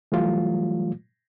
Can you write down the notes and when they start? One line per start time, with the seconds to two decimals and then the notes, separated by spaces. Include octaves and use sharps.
0.12 E3 F#3 G3 A3 F4